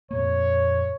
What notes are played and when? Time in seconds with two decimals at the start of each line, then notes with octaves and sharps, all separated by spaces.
0.11 F2 A#2 A#3 C#5